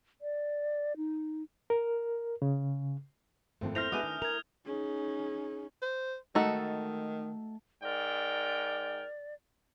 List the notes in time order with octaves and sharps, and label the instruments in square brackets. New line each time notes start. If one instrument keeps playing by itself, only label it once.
[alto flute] D5
D#4
[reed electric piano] A#4
C#3
[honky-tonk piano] G#1 F2 [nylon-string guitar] A3 A#3 C4
[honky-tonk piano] E4 E5 A#6 [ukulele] C5 [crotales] F6 G6 F7
[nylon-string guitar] G#3 B3 F#4 [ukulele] D4 B4 G#5 [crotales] D#6
[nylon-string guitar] D#3
[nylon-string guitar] A#4 [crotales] G#6 F7
[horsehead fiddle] C#4 D#4 [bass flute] G#4
[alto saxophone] C5
[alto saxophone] D#3 [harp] A3 [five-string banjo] D#4 F#4 A4
[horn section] G#2 A#4 G5 [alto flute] D5